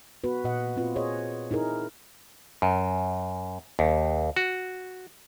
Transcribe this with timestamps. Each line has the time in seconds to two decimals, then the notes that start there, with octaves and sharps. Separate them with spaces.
0.24 B3 F#4 B4
0.44 A#2 D#5 F#5
0.77 C4 F4 B4
0.96 G#4 C5 C#5 D#5
1.51 D#4 E4 G#4 A#4
2.62 F#2
3.79 D#2
4.36 F#4